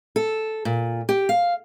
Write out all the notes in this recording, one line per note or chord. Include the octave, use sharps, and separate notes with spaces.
A4
A#2
G4
F5